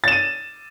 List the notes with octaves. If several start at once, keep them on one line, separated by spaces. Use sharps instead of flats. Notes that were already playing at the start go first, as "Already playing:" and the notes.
A6 D#7 E7